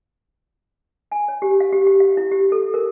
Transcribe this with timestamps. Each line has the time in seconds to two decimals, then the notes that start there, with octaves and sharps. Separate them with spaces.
1.12 G#5
1.28 C#5
1.42 G4
1.60 F5
1.72 G4
1.87 G4
2.00 F5
2.17 E4
2.31 G4
2.52 A4
2.74 A#4